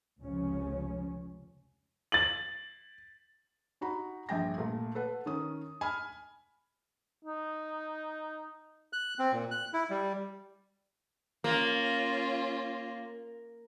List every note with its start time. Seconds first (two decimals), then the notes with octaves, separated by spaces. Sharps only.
0.21 F1 C#2 C#3 F3 C#4
2.12 A6 F#7
3.81 D#4 F#4 A#5 B5
4.29 A#1 G2 G5 G#5 A#6
4.58 A#2 A3
4.95 A4 B4 F#5
5.26 D#3 C#4 D#6
5.81 G#5 B5 F6
7.25 D#4
8.93 F#6
9.19 C4
9.32 A#2
9.51 F#6
9.74 E4
9.90 G3
11.44 A#3 C#4 F4